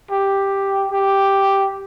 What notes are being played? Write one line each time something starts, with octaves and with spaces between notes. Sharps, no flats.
G4
G4